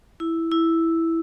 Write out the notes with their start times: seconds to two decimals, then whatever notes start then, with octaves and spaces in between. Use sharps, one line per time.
0.20 E4
0.51 E4